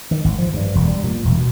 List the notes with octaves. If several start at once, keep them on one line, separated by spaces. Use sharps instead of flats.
D#3
G#1
F3
G2
E1
G3
A#2
E1
B2